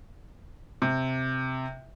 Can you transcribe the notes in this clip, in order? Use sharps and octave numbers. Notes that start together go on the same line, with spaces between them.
C3